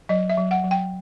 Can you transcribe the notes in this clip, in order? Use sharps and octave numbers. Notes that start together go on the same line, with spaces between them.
F#3 D#5
E5
F#3
F#5
F#3
G5